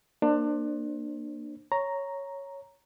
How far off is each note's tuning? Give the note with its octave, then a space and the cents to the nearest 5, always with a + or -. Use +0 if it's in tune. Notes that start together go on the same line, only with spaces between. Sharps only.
A#3 +0 D4 +25 C5 +30
C#5 +0 A#5 +0